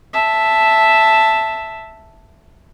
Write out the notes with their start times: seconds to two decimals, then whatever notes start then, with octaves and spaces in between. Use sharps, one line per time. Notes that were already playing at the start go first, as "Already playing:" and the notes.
0.13 E5 A5